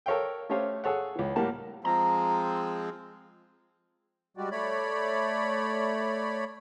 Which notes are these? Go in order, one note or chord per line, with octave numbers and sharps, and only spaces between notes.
A4 A#4 C#5 F5 G5
A3 C#4 G4 C5 C#5 F5
G#4 A4 C#5 F#5
C#2 E3
A2 G3 A#3 A#4 F#5 A5
F3 G#3 C4 A#5
G3 G#3 F#4 G4 D5
A3 C#5 D5 B5